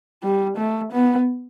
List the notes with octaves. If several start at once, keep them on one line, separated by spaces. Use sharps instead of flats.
G3
A3
B3